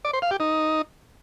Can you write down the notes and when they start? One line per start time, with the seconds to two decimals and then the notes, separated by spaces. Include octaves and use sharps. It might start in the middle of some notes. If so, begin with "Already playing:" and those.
0.05 D5
0.13 C5
0.22 F5
0.31 G4
0.40 D#4